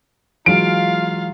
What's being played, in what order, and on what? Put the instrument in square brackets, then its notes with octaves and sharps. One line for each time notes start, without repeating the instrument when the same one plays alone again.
[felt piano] E3 F#3 G#3 [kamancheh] F4 F5 [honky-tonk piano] D7